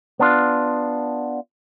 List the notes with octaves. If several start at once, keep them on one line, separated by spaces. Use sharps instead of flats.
B3 D4 F4